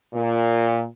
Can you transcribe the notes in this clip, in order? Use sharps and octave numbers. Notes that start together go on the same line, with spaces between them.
A#2